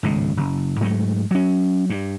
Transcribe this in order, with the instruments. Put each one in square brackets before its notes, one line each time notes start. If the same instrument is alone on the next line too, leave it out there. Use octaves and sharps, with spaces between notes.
[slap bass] G#1 C#2 A2
F#1
G#2 F#3 A3
F#3 C#4
G2